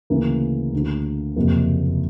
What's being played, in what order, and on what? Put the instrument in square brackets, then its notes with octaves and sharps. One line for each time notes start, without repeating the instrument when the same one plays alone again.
[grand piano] D2 C#3 E3 A#3
D2 D3
F#1 F2 C3 A#3